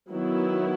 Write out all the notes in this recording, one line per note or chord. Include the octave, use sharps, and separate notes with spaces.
D#3 F#3 B3 E4